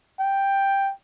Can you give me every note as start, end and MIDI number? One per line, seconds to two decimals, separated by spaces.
0.20 0.93 79